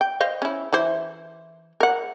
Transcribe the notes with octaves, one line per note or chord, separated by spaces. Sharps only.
G5
C5 D#5 F5
C#4 E4
E3 E4 C5
A#4 F#5